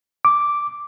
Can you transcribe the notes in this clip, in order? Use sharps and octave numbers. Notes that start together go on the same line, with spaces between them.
D6